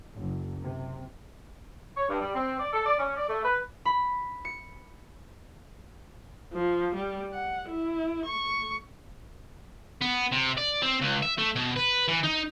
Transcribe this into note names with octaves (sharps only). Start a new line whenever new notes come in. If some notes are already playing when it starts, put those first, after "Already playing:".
F#1
C3
C#5
G2
G3
C4
D5
A4
D5
C#4
D5
A3
B4
B5
C#7
F3
G3
F#5
E4
C#6
B3
C3
D5
C4
C#2
E5
A3
B2
B4
E3
D#4